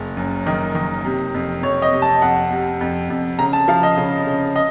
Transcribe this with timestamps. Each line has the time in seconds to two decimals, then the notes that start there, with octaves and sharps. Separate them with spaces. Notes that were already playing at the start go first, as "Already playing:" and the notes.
Already playing: F#1
0.17 F#2
0.46 D#3
0.75 D#3
1.05 C3
1.34 F2
1.63 F2 C#5
1.82 D#5
1.92 C3
2.02 A5
2.22 F2 F#5
2.51 C3
2.81 F2
3.10 F2
3.39 C#3 A#5
3.53 A5
3.68 F3 F5
3.83 D#5
3.97 C#3
4.27 C#3
4.56 D#5